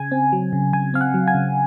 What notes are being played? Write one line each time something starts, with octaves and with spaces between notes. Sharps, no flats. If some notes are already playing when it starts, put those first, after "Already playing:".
Already playing: C#3 G#5
C4
F#3
C#3
C#3 G#5
C4 F5
F#5
F#3
G#5
C#3